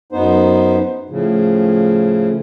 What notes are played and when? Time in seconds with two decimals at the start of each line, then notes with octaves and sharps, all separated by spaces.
0.12 F#2 B3 D#4 C5
1.10 A2 C#3 F3